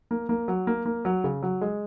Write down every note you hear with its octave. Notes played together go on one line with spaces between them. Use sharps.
A#3
A#3
F#3
A#3
A#3
F#3
C#3
F#3
G#3